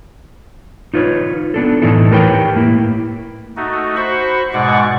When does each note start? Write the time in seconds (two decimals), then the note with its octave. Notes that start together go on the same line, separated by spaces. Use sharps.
0.94 D#4 F4 B4 C#5
1.54 B3 D4 A4
1.82 A2 E3 D#4 E4 A4
2.11 G4 A#4 B4 C#5 G5
2.55 A2 A#3 E4
3.57 A3 D#4 F#4
3.96 F#4 C5 B5 C#6
4.54 G#2 B2 G#3 D5 F#5 C#6